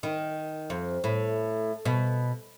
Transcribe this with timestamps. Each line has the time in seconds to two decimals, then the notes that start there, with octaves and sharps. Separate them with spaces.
0.03 D#3
0.70 F2
1.04 A2
1.85 B2